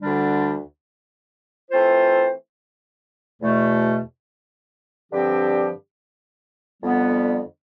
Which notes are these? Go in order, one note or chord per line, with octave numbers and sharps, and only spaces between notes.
D2 D3 G3 D4
E3 A3 C4 F4 C5
E2 B2 A3
G2 D3 F3 C4 G4
F2 D3 G3 B3